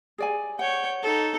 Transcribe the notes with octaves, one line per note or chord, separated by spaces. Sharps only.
G#4 D5 G#5
C#5 F#5 G5
D#4 A4